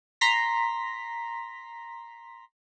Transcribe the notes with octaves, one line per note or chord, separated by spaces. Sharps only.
A#5 C6 A#6 B6